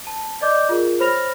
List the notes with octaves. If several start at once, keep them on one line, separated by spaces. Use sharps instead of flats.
A5
D5 D#5 D6 G6
F4 G#4 A#4
C5 C#5 B5 F6 A#6 F7